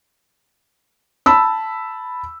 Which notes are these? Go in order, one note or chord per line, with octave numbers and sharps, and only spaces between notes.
A5 B5 E6